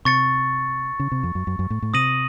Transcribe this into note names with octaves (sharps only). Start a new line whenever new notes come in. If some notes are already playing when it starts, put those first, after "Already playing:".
C3 C#6 A6 C#7
C#3
C3
F2
F#2
F#2
F#2
A2
A2
C3 D#6 A#6 D#7 F#7